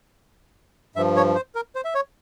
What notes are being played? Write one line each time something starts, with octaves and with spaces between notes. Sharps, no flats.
G2 F3 E5
C#5
C5
A#4
C5
E5
C#5